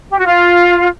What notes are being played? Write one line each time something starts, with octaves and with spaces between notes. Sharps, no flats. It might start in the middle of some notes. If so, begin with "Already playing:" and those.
G4
F#4
F4